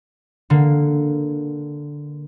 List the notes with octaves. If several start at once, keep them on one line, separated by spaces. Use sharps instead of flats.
D3 A#3